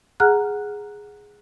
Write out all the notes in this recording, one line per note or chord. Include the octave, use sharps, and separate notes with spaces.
G#4 F#5 A#5 F6 F#6